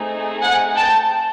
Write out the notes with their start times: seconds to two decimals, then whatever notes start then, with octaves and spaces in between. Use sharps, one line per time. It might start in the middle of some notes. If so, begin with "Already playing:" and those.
Already playing: A3 C4 D#4 G#4
0.42 F#5 G#5
0.77 G5 A5